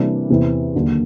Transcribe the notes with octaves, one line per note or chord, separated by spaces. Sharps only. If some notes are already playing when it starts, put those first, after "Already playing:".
Already playing: C3 E3 G3 A#3 D4
E2 C3 E3
D#2 D3 F#3 A#3